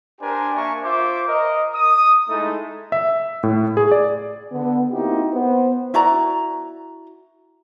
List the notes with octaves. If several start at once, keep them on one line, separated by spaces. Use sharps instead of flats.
D4 G4 A#4 C5 G#5
A#3 D4 A#4 E5 G#5 C#6
F4 C5 E5 D6
A#4 D#5
D#6
G#3 A3 D#4 E4 A4
E5
A2
G#4
D5
D3 B3
A#3 C4 D#4 E4 F#4 G4
B3 C5
E4 F#4 D5 A#5